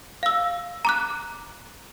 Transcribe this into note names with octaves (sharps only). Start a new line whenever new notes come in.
F5 E6
A#5 D6 F#6